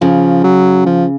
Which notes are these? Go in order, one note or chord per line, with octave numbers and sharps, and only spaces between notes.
C#3 F3
F#3
F3